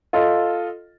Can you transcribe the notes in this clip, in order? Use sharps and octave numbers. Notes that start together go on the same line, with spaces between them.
F4 A4 D#5